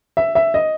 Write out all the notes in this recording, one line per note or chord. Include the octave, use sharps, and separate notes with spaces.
E5
E5
D#5